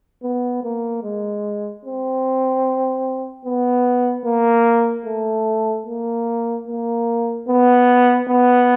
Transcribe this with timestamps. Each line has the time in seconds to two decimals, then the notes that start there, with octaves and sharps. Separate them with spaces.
0.23 B3
0.64 A#3
1.04 G#3
1.85 C4
3.46 B3
4.26 A#3
5.06 A3
5.86 A#3
6.68 A#3
7.48 B3
8.28 B3